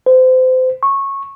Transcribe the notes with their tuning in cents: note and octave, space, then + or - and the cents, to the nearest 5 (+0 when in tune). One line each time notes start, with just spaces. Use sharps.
C5 -30
C#6 -15